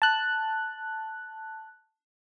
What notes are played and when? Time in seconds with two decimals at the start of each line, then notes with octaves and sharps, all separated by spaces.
0.02 A5 F#6